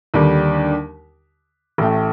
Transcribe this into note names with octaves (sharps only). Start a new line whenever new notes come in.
D#2 D3 G3
A1 A2 A3